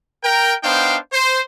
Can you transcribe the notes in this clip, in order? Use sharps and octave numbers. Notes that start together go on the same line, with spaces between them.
A#4 G5
B3 D4 D#4 C5 F5 G5
C5